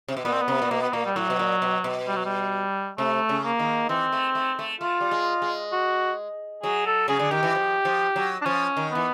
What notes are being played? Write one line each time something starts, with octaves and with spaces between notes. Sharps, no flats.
C3
B2
A#2 B3
C4
B3
C3
A#2
B2 A#3
B3
A#2 A#3
G3
A2 F#3
B2
A#2
B2
B2
G3
F#3
G3
C3 A3
C#3
A#3
D#3
E3 C4
A3
A3
A3
A3 F4
G3
G#3
G#3
F#4
F#3 G#4
A4
C#3 G#4
D3
D#3 G4
E3
F3
F3
F#3
D4
F3 C#4
D#3
E3 B3